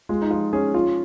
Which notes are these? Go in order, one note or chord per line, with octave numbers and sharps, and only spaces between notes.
G#3 F4
D#4
F3 F4
C#4 G#4
F3 F4